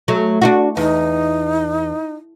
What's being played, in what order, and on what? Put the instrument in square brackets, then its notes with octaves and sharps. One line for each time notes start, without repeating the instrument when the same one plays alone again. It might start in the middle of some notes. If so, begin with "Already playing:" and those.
[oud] F#3 A3
D4 D#4 F#4
[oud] E2 [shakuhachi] D#4